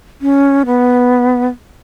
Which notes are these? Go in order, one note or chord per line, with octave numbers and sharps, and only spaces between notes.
C#4
B3